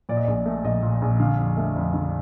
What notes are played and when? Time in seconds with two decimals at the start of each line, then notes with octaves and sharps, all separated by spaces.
0.09 A#2 D5
0.17 D#5
0.24 A#1 D5
0.46 A3
0.64 A#1 D#5
0.82 A#2
1.02 A#1
1.20 D3 F5
1.39 F2
1.57 A3
1.76 F2
1.94 D3